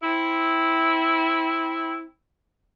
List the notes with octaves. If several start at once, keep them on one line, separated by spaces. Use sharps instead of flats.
C4 E4